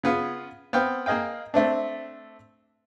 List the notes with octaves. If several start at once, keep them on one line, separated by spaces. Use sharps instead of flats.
C#3 B3 F4
B3 C4 F5 G5
A#3 G#4 D#5 F5 G5
A3 C4 D4